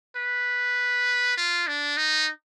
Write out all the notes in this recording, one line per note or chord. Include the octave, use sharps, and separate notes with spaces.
B4
F4
D4
D#4